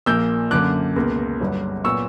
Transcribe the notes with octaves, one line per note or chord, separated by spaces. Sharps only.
A#1 A#2 A#3 E6 G6
F#2 D3 A#3 D6 F#6
C#2 B2 A#3
G1 G2 F#3
A#2 F#3 B3 C#6 E6